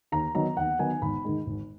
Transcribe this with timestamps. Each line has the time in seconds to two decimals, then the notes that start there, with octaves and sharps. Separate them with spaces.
0.12 D#2 A#5
0.35 D#3 F#3 B3 D#4 A#5
0.57 D#2 F#5
0.79 D#3 F#3 B3 D#4 G#5
1.02 G#1 B5
1.24 G#2 D#3 G#3
1.47 G#1